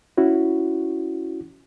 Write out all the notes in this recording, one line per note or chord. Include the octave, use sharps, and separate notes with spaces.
C#4 E4 F#4